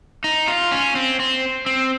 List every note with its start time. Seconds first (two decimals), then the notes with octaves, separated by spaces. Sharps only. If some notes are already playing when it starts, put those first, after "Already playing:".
0.24 D#4
0.48 F4
0.71 C#4
0.96 C4
1.19 C4
1.66 C4